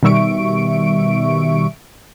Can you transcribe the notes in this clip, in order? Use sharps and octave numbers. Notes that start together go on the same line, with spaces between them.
B2 D#3 G3 E5 C#6 D7